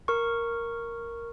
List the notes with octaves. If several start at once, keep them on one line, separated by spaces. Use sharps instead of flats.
A#4 C#6